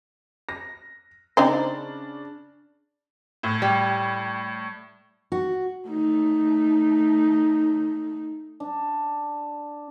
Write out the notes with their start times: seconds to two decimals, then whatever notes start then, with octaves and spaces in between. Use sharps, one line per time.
0.49 A#6
1.37 C#3 C4 D4 D#4 C5
3.43 A2
3.62 G3
5.32 F#4
5.88 A3 D#4
8.60 D4